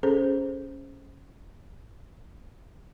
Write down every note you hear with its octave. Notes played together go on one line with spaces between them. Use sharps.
C#4 G#4 A4 C5